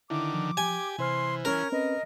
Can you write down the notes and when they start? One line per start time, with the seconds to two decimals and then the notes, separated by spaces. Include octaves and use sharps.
0.10 D3 D#3 E4 D6
0.34 F3
0.57 G4 G#5
0.98 C3 E3 C5 C6 F6
1.45 C#4 A#4
1.72 C4 C#4 B4 D#5